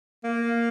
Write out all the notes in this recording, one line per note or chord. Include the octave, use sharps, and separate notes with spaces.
A#3